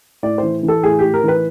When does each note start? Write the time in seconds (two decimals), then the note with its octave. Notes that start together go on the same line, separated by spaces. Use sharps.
0.23 A2 D5
0.38 E3 C5
0.63 E3
0.68 A4
0.83 A2 G#4
0.99 A2 G4
1.14 A#4
1.23 E3 B4